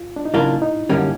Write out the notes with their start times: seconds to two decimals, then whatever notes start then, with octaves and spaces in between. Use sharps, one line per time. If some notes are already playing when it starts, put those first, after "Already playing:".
Already playing: F4
0.16 D4
0.25 D#4
0.34 C#3 F#3 A#3 D4 E4 F4
0.62 D#4
0.89 F#2 D3 G3 A#3 C#4